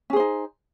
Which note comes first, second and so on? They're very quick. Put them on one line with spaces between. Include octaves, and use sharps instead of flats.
C#4 G#4 C5 D#4